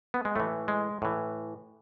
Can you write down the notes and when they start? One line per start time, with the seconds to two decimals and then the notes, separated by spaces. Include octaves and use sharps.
0.14 B3
0.25 G#3
0.36 A2 E3 A3
0.68 G#3
1.02 A2 E3